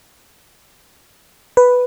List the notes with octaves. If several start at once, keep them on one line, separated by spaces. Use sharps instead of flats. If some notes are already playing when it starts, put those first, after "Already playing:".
B4